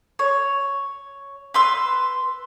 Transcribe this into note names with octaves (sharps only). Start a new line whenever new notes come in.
C#5
B4 C6 E6